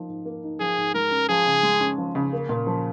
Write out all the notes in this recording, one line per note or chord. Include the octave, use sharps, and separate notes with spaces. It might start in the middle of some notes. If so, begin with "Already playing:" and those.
Already playing: F3 A#3 D#4
G#2
A#3
D#4
F3 G#4
G#2
G#3 A#4
C#4
F3 G#4
C#3
G#3
C#4
F3
C#3
A#3
A#2
F3